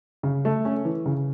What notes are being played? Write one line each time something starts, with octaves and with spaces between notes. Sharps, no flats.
C#3
A3
C#4
E3
C#3